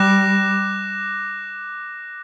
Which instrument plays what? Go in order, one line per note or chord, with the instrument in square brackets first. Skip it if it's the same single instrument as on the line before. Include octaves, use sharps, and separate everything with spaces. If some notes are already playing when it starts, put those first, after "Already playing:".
Already playing: [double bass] G3 [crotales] D6 F#6 A#6 E7